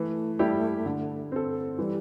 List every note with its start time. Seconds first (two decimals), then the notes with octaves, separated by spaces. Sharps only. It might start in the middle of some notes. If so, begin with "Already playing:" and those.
Already playing: E3 A3
0.39 G3 E4 G4
0.86 D3
1.32 C4 A4
1.78 E3 G3